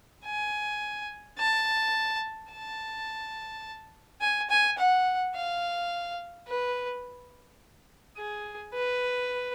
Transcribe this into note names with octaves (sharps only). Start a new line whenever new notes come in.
G#5
A5
A5
G#5
G#5
F#5
F5
B4
G#4
B4